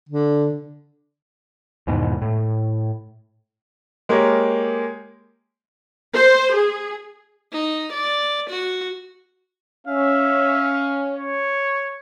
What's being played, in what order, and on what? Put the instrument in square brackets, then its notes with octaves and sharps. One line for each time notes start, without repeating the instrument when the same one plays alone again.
[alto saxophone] D3
[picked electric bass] E2 G#2 B2 D#3
A2
[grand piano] G#3 A#3 G4 A#4 C#5
[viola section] C5
G#4
[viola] D#4
D5
F#4
[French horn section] C#4 [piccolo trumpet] E5 [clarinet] F5
[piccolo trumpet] C#5